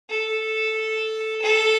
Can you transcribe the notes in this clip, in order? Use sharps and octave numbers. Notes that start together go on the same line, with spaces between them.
A4
A4